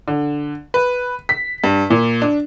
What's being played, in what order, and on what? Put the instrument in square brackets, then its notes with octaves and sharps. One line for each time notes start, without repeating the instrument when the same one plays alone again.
[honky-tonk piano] D3
B4
B6
G2
A#2
D4